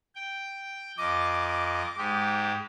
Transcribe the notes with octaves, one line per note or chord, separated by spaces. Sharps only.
G5
F2 D#5 D6
G#2 G#3 G4